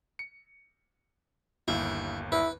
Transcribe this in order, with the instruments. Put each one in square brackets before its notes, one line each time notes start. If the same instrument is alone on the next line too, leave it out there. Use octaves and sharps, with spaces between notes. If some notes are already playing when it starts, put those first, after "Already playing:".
[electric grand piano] C#7
[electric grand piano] G1 D#2 F5 [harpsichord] E4
[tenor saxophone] E4 [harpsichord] B4